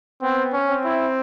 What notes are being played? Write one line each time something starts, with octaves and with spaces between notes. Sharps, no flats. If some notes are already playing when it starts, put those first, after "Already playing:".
B3 C4
C#4
C4
E4